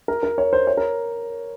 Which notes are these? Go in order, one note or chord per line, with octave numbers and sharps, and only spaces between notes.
A#4
A#4
C#5
C5
C#5
A#4